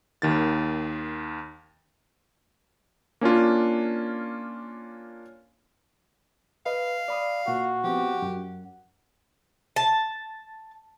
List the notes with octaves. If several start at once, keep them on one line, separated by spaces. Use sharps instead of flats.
D#2 D#3 A6
A#3 C#4 D4 F4
B4 D#5 F5
D5 B5 D#6
A#2 F#4
F3 B3 C4 G4
F#2 F#5
A5